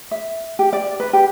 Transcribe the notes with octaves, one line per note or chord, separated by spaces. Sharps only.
E5
G4
D5
B4
G4